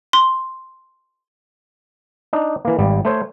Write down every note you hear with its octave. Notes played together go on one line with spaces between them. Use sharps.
C6
D4 D#4
E3 A#3
G#1 G3
A3 C5 C#5